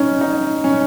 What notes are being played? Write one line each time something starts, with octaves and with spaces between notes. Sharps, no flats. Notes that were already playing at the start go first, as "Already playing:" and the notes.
Already playing: C#4 D#4
D#4
C#4